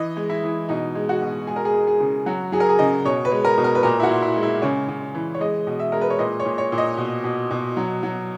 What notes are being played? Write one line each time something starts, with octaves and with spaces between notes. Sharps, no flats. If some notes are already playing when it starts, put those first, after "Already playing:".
Already playing: E3 D#5
G#3
E4
E3
B2 D#4
G#3
F#4
B2
G#3 G#4
A#4
G#4
G#3
G#4
C#3
F#3 F#4
F#3 G#4
A#4
G#4
C#3 D#5
B2 C#5
B4
G#3
A#4
B2
A#4
B4
A#2 A#4
E4
F#4
A#2
E4
G#3
E4
C#3 C#5
C#3
E3
C#5
G#3 D#5
B2
E5
G#3 A#4
B4
C#5
A#2 D#5
C#5
A#2
C#5
A#2
D#5
B2
B2
B2
F#3
F#3